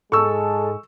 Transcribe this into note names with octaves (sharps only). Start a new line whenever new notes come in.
G#2 G#3 A4 C#6 E6